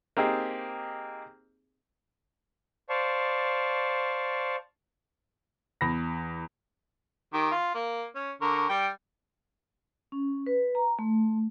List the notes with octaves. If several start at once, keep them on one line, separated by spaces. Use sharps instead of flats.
A#3 C4 D#4 G4 G#4
C5 D5 F5 A5 C#6
E2 B5 A#6
D#3 G4
F4
A#3
C#4
D3 A#4 C#6
G3 G5
C#4
B4
A#5
A3